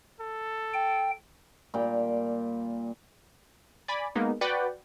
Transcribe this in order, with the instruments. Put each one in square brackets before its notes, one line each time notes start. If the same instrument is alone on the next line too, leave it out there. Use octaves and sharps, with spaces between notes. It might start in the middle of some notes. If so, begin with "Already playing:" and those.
[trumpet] A4
[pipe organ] G5
[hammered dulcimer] A#2 G3 G5
[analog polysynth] D5 G#5 B5
G#3 A#3 B3 D#4
F#4 B4 D5 F#5 G5